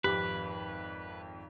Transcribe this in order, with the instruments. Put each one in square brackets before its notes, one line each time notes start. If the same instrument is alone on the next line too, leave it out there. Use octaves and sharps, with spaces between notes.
[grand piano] G#1 F2 [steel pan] G4 [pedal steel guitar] B4